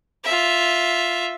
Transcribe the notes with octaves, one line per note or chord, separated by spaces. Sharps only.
F4 E5